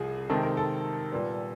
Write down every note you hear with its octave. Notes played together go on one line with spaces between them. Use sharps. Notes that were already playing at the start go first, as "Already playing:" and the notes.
Already playing: C2 C3 F3 G#4
C3 D#3 G#3 C4 A4
A#4
A4
A#2 G3 B3